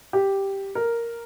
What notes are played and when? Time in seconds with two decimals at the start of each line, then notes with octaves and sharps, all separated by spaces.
0.13 G4
0.75 A#4